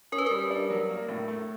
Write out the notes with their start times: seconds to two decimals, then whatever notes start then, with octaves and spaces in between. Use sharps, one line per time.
0.12 C#4 A#4
0.18 B4
0.26 G3 A#4
0.50 D4
0.70 F#3
0.89 A#3
1.08 A2
1.28 A3